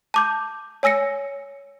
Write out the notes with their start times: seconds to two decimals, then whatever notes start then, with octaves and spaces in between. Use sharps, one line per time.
0.14 A5 D6 G6
0.83 C#5 G#5 E6 A#6 C#7